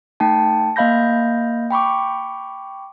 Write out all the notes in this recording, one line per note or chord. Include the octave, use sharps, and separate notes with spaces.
A3 D#4 G5 A5
A#3 D#5 F5 B5 G6 A#6
G5 B5 C#6 D6